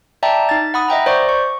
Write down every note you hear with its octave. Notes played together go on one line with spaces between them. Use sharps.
D5 E5 G5 A5 A#5
D#4 A6
F#5 B5 D#6
D#5 E5 G5 A#5
C5 D5 C#6
C#6